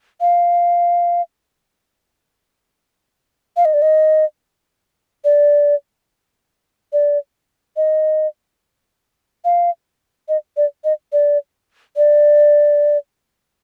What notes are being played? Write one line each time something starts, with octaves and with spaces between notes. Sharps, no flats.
F5
F5
D#5
D5
D#5
D5
D5
D#5
F5
D#5
D5
D#5
D5
D5